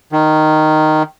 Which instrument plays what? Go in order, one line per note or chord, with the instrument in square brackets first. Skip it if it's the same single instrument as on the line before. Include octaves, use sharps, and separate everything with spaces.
[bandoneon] D#3